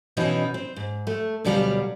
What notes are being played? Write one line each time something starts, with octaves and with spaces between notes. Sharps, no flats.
B2 E3 C#4 D#4 E4
C4
G#2
A3
D2 B2 F#3 G3 G#4 F5